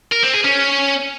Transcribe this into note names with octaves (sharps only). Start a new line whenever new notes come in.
A#4
C4
G#4
C#4